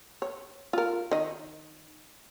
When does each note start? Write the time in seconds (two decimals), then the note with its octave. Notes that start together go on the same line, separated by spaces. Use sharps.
0.22 C#5
0.73 F4 A#4
1.11 D#3 D#5